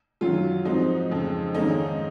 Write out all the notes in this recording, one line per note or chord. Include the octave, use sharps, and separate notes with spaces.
F#2 D#3 F#3 F4
G#2 F3 C4 D#4
F2 C#3 G#3
G#2 D#3 A#3 C#4 D#4